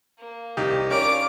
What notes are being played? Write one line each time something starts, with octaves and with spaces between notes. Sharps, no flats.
A#3
C2 D#4 G4
C#4 F4 A#4 D5 D6